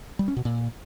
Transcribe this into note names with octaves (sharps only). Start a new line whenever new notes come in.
G3
C#4
B2
A#2